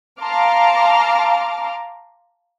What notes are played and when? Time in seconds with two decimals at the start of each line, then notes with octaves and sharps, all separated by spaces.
0.21 F5 A5 A#5 C6 D6 F6